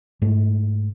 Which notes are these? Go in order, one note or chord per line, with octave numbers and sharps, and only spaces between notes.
G#2 A3